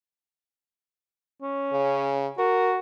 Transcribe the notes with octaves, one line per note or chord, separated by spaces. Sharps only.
C#4
C#3
F#4 A#4